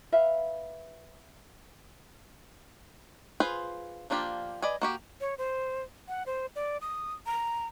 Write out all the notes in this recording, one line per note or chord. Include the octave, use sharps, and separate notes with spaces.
B4 E5 F5
F4 G#4 B4 C5
F3 A#3 D4 F4 G4
B4 D5 D#5 G#5
A#3 F#4 G4
C#5
C5
F#5
C5
D5
D#6
A#5